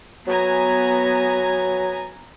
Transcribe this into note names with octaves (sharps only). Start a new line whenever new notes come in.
F#3 B3 G#5 A#5